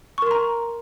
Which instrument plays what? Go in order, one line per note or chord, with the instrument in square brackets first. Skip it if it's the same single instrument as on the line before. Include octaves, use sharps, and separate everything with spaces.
[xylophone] C#6
A#4
C6
A#5